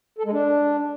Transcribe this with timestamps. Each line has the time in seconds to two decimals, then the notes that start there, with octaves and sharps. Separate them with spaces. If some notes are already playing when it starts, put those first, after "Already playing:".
0.18 A4
0.25 G#3
0.33 D4